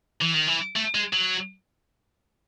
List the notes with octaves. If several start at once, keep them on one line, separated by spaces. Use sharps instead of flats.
E3
D#3
E3
A3
G#3
F#3